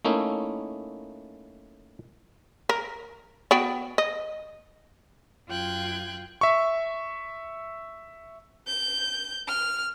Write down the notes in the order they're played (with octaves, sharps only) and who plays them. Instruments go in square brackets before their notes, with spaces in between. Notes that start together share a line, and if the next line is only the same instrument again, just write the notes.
[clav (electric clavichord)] A3 A#3 C#4 D#4 E4
[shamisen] A#4
B3 F#4 G5
D#5
[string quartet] F#2 F4 G5 F#6 G#6
[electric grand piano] E5 C#6
[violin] G6
F6